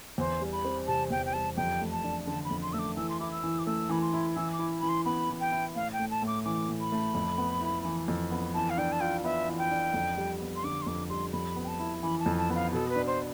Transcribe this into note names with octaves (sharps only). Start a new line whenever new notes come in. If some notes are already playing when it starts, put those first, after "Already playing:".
E2 C5
G3
B5
C4
C3 A5
E2 G5
G5
G3 A5
F2 G5
A3
A5
D4
D3 A5
B5
F2
C6
A3 E6
D6
E3 E6
C6
E4 D6
E6
E3
D6
A3 E6
E3 B5
C6
E4
E3 E6
D6
E4
E3 B5
C6
B3 B5
E3
G5
E4
A2 F5
G5
A3
A5
A2
D6
E3 D6
A2
B5
A3
F2
B3
E4
E3
F2
B3
E3 A5
F5
D4 G5
A5
F4 G5
B3 E5
E3
G5
D4
F2
G3
B3
C6
D3 D6
C6
F2 D6
G3 C6
F2 B5
B3
G5
A5
E4
E3 B5
A5
F2
A5
B3
F5
B2 A4
B4
D4
C5